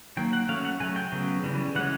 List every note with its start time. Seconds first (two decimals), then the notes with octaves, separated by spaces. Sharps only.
0.17 D#3 F#3 A#3 G5
0.33 F#5
0.49 F#3 A3 C#4 F5
0.65 F#5
0.80 C#3 F#3 A3 G#5
0.96 G5
1.12 C#3 F#3 B3
1.44 C#3 E3 G3
1.75 E3 G#3 C#4 F#5